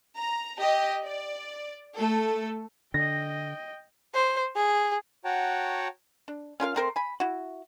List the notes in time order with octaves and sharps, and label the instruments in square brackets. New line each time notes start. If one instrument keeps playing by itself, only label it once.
[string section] A#5
G4 D#5
D5
A3 A4
[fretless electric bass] D3 [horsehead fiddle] D#5 G5 [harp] A#6
[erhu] C5
G#4
[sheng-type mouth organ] F#4 C#5 F#5 G5 A5 A#5
[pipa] D4
C#4 F4 A#4 F5
A3 C4 A#4 C5
G#5 B5
E4 F#4